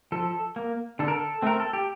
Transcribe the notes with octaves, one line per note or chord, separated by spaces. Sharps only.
F3 A4
A#3
D3 A4
A#4
A4
A3 C4 A#4
A4
G4